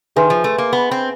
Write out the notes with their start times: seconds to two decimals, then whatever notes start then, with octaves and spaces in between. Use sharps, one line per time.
0.16 D#3 G#4 B4 E5 G#5 C6
0.30 F3
0.44 A3
0.58 A#3
0.73 B3
0.91 C4